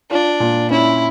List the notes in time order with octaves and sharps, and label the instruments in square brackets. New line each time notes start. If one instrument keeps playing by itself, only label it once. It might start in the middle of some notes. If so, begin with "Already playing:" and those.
[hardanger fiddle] D4 [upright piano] F4
[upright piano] A#2
[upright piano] C#4 [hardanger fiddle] E4